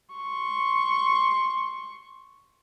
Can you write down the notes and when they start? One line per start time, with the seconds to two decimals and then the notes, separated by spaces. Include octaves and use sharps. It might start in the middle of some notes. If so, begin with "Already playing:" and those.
0.14 C6 C#6